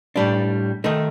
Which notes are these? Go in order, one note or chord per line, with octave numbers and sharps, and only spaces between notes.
A2 G3 D4
D#3 A3 D#4